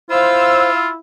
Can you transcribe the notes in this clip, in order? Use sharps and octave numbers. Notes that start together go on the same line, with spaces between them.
E4 F4 C5 F5 E6